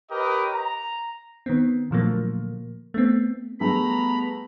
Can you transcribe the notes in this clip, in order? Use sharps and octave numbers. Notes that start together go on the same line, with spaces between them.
G4 A#4 B4 C#5 D#5
A#5
D#3 B3 C4
A#2 D3 F3 F#3 A3 A#3
A3 B3 C4
G3 A3 B3 G#4 A#5 B5